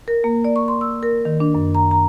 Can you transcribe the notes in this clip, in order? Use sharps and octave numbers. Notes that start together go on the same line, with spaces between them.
A#4
A#3
D5
C#6
C6
E6
A#4
D#3
D4
F#2
A#5
A#5